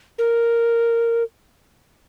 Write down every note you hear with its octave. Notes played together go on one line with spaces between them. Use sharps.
A#4